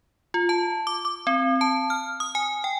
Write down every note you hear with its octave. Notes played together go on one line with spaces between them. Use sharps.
F4
A5
D6
D6
C4
A5
F6
D#6
G#5
G5